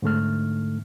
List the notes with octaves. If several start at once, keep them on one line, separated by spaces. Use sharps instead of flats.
G#2 D3 A3 F6